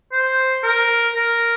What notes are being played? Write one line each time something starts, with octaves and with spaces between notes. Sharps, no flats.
C5
A#4
A#4